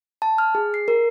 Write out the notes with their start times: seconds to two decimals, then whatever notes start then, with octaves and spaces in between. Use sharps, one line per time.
0.22 A5
0.38 F6
0.55 G#4
0.74 C7
0.88 A#4